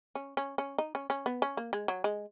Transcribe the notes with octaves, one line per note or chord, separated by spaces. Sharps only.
C#4
C#4
C#4
D#4
C#4
C#4
B3
C#4
A#3
G#3
F#3
G#3